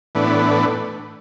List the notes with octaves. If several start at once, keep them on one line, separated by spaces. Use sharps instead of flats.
A2 E3 B3 D4